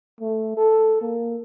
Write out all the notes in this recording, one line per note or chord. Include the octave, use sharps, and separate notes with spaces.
A3
A4
A#3